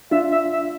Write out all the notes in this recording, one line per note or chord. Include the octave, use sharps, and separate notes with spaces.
D4 F4 E5
E5
E5